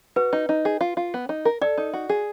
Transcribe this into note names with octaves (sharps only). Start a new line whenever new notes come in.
F#4 B4
D#4
D#4
G#4
F4
F4
B3
D#4
A#4
A4 D5
D#4
F#4
G#4